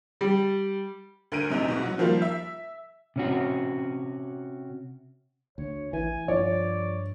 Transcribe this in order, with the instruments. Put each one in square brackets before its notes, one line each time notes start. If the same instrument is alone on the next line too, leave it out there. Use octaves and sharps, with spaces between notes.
[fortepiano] G3
[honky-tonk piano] D2 D3 A#4 D7 D#7
F#2 C3 D#4
G#2 B2
F#3 F#4
D#3 F3 G3 A#3 F4
E5
[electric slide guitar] C3 C#4 F#4
[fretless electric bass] D2 [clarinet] C#5
[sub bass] A1 [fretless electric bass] E3 [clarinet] G#5
[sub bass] G2 [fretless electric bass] F3 [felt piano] C#5 [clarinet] D5